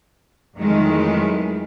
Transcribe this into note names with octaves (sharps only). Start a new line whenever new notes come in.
F2 D#3 E3 F#3 G#3 A3